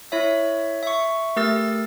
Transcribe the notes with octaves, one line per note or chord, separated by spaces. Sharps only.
E4 C#5 E5
E5 C#6
A3 G4 A#4 E6 A6